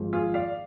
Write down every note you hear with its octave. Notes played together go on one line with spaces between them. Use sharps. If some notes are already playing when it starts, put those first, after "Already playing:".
Already playing: G#1 G#2 F3
F4 G#4
D5 F5